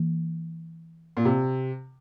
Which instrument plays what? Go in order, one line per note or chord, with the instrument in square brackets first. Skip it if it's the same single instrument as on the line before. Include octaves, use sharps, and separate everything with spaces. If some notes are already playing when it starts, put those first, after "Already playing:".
Already playing: [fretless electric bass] E3 A#3
[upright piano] A#2
C3